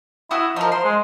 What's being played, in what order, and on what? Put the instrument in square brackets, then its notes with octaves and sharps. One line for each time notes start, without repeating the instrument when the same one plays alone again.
[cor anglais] E4 [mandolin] F#4 E5 D#6
[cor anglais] F3 [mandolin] D#4 A#4
[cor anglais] C5 [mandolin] C6
[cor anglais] G#3